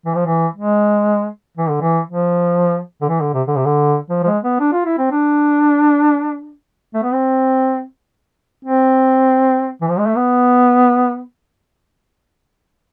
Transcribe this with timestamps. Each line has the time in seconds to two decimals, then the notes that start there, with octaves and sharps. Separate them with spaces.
0.06 E3
0.15 F3
0.26 E3
0.56 G#3
1.57 E3
1.70 D3
1.81 E3
2.08 F3
3.02 D3
3.09 E3
3.21 D3
3.34 C3
3.47 D3
3.57 C3
3.66 D3
4.10 F3
4.23 F3
4.27 G#3
4.44 B3
4.60 D4
4.73 F4
4.86 E4
4.98 C4
5.12 D4
6.94 A3
7.03 B3
7.13 C4
8.65 C4
9.81 E3
9.89 F3
9.99 G#3
10.07 A3
10.16 B3